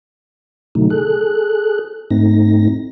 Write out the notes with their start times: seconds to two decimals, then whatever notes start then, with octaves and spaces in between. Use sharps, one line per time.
0.75 B2 D3 F#3 A3 D#4
0.90 G#4 A4 F#6
2.10 G#2 A3 C4 D#4 A#6